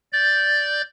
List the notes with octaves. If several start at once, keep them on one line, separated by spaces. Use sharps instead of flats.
D5 G6 A6